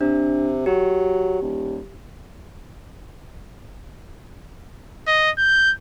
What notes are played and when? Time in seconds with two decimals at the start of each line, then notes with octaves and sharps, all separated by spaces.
0.01 C3 D4
0.66 F#3 G4
1.42 D#1
5.07 D#5
5.38 G6